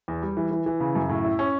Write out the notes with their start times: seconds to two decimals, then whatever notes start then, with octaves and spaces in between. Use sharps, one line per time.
0.08 E2
0.22 G3
0.37 E3
0.51 E3
0.66 E3
0.80 C#3
0.95 F#2
1.09 A2
1.25 E4
1.39 C#4